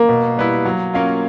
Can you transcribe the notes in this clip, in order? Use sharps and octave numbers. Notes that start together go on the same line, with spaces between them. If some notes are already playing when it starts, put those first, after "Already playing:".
Already playing: A#3
B2
G3 B3 E4
F#3
A#3 C#4 F4